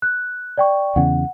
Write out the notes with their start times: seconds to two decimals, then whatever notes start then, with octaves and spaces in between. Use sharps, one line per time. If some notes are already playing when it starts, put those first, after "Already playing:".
0.02 F#6
0.58 D5 G5 C#6
0.96 E2 C#3 F#5